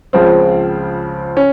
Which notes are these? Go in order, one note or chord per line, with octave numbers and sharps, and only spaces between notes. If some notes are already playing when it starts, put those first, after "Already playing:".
C#2 C#3 F3 C4
C#4